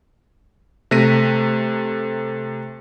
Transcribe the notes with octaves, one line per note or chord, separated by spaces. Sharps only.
C3 A3 A#6 B6 D#7